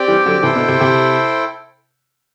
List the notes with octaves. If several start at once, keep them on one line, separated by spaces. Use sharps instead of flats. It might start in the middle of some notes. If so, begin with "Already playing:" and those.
Already playing: C4 G4 D5 G5
E3 G3
D3 F#3
C3 E3 E4 A4 C5 G5
B2 D3
C3
C3